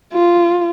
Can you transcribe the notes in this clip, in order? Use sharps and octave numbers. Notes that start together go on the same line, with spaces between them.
F4